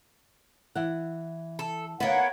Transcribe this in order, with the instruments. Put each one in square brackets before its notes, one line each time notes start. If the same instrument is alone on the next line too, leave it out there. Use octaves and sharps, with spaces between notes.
[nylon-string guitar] E3 F#5
[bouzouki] A4
[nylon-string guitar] D2 D#4 [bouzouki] A#3 B3 [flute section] C#5 F#5